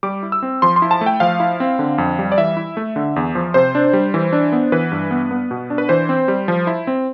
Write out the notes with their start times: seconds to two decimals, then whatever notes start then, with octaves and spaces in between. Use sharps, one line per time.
0.03 G3 D6
0.23 E4
0.32 E6
0.42 C4
0.62 F3 C6
0.76 C6
0.82 E4
0.91 A5
1.01 A3
1.06 G5
1.20 F3 F5
1.40 E4
1.60 C4
1.79 D3
1.98 F2
2.19 G3
2.32 D5
2.38 E3 E5
2.57 E4
2.77 A3
2.96 D3
3.16 E2
3.35 F3
3.54 C3 C5
3.75 D4
3.93 G3
4.14 E3
4.33 D4
4.52 B3
4.72 E3 B4
4.92 G2
5.11 B3
5.31 B3
5.51 B2
5.70 D4
5.78 B4
5.89 E3 C5
6.09 C4
6.28 G3
6.48 F3
6.67 E4
6.87 C4